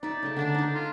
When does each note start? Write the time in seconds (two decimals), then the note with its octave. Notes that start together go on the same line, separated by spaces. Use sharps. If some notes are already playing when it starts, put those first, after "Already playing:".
0.03 D#4 D5 E5
0.23 C#3 A3 A5
0.36 D3 D4 A5 A#5
0.54 D#4 A5
0.75 F4